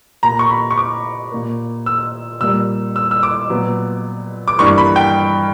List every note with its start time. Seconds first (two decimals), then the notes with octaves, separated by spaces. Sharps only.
0.23 A#2 A#3 A#5
0.39 C#6
0.50 B5
0.71 C#6
0.78 D6
1.32 A#2 A#3
1.86 E6
2.41 A#2 G3 A#3 E6
2.96 E6
3.11 E6
3.23 D6
3.50 A#2 F#3 B3
4.48 D6
4.59 G2 E3 G3 A#3 C#6
4.78 B5
4.96 G5